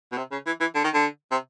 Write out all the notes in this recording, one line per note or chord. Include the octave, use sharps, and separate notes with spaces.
B2
C3
C#3
E3
E3
D3
D#3
D3
C3